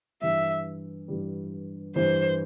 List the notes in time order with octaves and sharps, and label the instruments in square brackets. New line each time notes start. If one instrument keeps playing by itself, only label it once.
[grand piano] G2 E3 G3 [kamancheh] E5
[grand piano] G2 E3 G3
[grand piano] G2 E3 G3 [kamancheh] C5